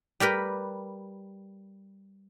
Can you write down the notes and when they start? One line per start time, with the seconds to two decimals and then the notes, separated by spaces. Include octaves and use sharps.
0.20 G3 G4 A#4 B4